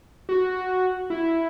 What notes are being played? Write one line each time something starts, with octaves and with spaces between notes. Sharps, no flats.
F#4
E4